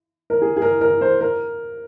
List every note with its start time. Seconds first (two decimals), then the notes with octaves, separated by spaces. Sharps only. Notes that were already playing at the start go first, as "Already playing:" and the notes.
0.30 A#4
0.42 G#4
0.57 G#4
0.62 A#4
0.81 A#4
1.01 C5
1.21 A#4